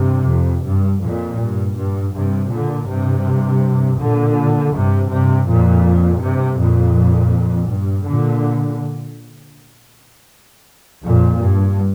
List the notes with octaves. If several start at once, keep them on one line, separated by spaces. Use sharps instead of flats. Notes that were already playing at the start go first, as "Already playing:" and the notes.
Already playing: G2 C3
F2
G2
F2 A#2
G2
G2
G2 C3
A#2 D3
G2 C3
A#2 D3
G2 C3
G2 C3
F2 A#2
G2 C3
F2 A#2
G2
A#2 D3
F2 A#2
G2